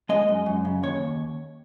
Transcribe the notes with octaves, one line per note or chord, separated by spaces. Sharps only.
G#3 D#5
F#2
F#2
C#3
D#2 C#5